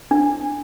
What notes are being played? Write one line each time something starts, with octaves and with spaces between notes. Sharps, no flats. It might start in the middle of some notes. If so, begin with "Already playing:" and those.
D4